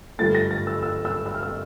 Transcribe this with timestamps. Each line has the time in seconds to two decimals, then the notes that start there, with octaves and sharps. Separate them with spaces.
0.19 G2 D3 F3 A3 A6
0.35 A#6
0.51 A6
0.67 E6
0.83 E6
1.05 E6
1.26 E6
1.34 F6
1.43 E6